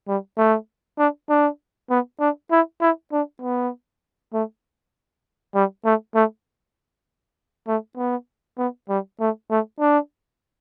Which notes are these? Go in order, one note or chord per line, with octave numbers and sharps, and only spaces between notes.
G3
A3
D4
D4
B3
D4
E4
E4
D4
B3
A3
G3
A3
A3
A3
B3
B3
G3
A3
A3
D4